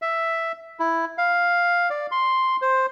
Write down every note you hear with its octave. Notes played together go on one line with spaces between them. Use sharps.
E5
E4
F5
D5
C6
C5